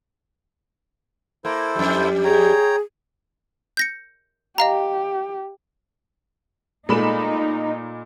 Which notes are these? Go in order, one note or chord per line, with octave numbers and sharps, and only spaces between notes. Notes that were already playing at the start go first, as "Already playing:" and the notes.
A#3 E4 A4 C5
F2 G3
G#4 C#5 G5 A#5
G6 A#6 C#7
G4 D#5 F5 A#5
A#2 G#3 A3 D#4 B5 E7